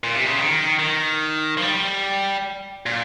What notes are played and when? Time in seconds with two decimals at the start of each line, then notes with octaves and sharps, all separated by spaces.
0.04 A#2
0.15 C3
0.27 C#3
0.39 D#3
0.79 D#3
1.57 F3
1.62 G3
2.86 A#2